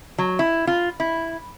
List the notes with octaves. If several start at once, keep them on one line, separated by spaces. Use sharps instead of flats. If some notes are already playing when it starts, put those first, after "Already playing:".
F#3
E4
F4
E4